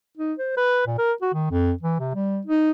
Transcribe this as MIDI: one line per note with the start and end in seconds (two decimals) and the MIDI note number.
0.18 0.33 63
0.38 0.56 72
0.57 0.82 71
0.87 0.97 46
0.98 1.12 70
1.22 1.31 66
1.34 1.50 51
1.51 1.72 41
1.83 1.97 52
2.00 2.14 48
2.15 2.41 55
2.47 2.71 63